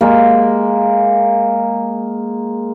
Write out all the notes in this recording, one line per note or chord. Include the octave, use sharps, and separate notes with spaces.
G#3 A#3